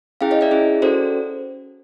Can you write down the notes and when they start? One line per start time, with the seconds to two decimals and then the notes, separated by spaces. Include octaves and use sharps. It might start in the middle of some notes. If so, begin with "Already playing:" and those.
0.21 C#4 E4 G#4 F5 G5
0.31 C#5 D#5
0.41 D5 E5
0.51 C#4 E4 G#4
0.82 C#4 F#4 A4 C5 D5